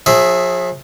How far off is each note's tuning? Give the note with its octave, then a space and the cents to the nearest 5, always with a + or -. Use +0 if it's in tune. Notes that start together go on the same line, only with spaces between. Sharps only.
F3 +45 G#4 +0 E5 +0